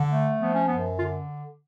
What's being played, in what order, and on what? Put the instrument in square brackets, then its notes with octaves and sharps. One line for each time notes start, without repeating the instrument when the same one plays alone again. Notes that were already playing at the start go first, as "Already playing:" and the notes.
Already playing: [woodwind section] D3
A3
F3 B3
C#4
F#2 B3
D3 F4